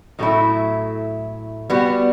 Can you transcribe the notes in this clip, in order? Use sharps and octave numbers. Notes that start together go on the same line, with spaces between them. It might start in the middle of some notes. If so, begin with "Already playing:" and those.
A2 F#3 A3 E4
G3 B3 F#4